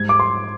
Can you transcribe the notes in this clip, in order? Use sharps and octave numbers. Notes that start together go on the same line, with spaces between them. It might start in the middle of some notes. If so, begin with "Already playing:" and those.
Already playing: G#2 G3 G#6
D6
C6